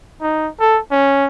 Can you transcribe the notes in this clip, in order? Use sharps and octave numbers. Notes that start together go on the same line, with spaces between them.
D#4
A4
C#4